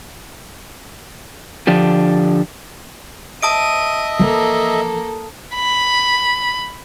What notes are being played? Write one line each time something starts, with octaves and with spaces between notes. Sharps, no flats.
D3 F3 D4 G4
D#5 E5 A5 D#6 D7 D#7
E3 F3 A#3 A4
B5